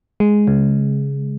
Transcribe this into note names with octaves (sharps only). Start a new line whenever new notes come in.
G#3
C#3